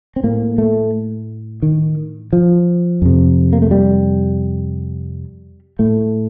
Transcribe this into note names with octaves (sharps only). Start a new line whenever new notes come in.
C4
A2 A#3
A3
D#3
F3
F2 C3
A#3
A3
G3
A2 A3